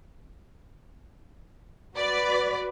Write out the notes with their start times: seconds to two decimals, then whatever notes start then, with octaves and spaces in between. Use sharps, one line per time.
1.96 F#4 B4 D5